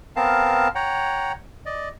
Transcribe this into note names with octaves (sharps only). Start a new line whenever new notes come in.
B3 C4 A#4 F5 A5
C#5 F#5 G5 A#5
D5 D#5